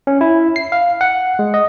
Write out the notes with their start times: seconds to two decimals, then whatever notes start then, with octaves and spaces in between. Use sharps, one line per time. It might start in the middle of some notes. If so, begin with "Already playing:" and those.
0.07 C#4
0.21 E4
0.56 C7
0.72 F5
1.01 F#5
1.39 G#3
1.54 D#5